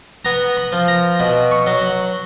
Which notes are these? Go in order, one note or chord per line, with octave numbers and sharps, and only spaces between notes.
B3 A#5
B5
F3
A#5
B2 B5
C#6
F#3
B5